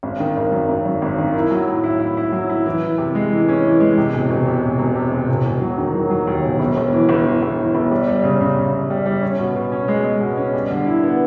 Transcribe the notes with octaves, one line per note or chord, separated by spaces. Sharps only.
G#1
D#3
G#1
F#2
G#1
F#2
G#1
D#3
E4
F#3
A2
E4
E4
E4
F#3
E4
E3
E3
C3
G#3
E3
C#4
E3
G#3
C3
E1
E1
C3
E1
E1
C3
E1
E1
E1
F#3
D#3
F#3
F#3
D#2
E1
G1
G1
E3
G1
E3
G1
E3
G1
G3
G3
C#3
C#3
C#3
C#3
G3
G3
C#4
B2
B2
C#4
G#3
G#3
B2
C#4
G3
D3
E4
B3